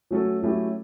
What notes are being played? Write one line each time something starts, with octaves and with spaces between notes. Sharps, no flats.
F#3 A3 C#4 F#4 A4
F#3 A3 C#4 E4 G4